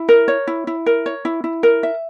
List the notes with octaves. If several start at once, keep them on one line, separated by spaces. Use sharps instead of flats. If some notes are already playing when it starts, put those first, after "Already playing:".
Already playing: E4
A#4
C#5
E4
E4
A#4
C#5
E4
E4
A#4
E5